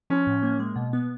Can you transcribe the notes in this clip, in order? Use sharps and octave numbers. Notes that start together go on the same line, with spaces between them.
F3 C#4
A2
A#3
G#3
B2
B3